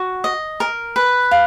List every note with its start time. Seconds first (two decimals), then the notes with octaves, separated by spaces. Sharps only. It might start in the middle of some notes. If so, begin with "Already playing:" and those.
Already playing: F#4
0.24 D#5
0.60 A#4
0.96 B4
1.31 F5